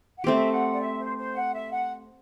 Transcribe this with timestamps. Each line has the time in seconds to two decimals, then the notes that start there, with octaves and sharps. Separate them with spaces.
0.18 F#5
0.24 A3 C4 G4 E5
0.52 F#5
0.72 D5
0.80 E5
0.99 C5
1.17 C5
1.35 F#5
1.54 E5
1.72 F#5